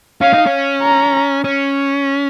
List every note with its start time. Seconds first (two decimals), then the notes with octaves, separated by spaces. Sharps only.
0.21 C#4 F5
0.34 D#4
0.46 C#4
0.82 A#5
1.44 C#4